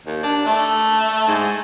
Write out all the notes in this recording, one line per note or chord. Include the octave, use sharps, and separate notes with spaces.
D#2
D4
A3
G#2